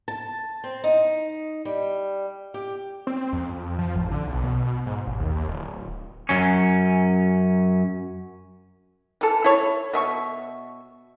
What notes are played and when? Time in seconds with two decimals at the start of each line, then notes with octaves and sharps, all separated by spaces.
0.08 A5
0.64 C4
0.84 D#4
1.65 G3
2.54 G4
3.07 C4
3.33 F2
3.79 F3
3.96 A1
4.11 D3
4.28 B1
4.44 B2
4.86 G#2
5.07 A1
5.20 D#2
5.48 D1
6.29 F#2 C#4
9.21 E3 A4
9.44 E4 C#5
9.94 B2 E5 C#6